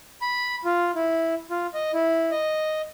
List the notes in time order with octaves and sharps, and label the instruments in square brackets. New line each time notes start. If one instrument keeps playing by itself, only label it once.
[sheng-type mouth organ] B5
F4
E4
F4
D#5
E4
D#5